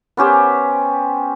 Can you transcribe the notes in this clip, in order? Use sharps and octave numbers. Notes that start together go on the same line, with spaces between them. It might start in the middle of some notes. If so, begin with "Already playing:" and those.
B3 C#4 G4 C5